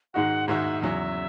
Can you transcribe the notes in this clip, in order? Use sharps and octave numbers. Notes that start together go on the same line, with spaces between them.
G#2 D#3 G#3 D#4 F#4 F#5
G#2 D#3 G#3 D#4 F#4 E5
E2 C#3 F#3 C#4 E5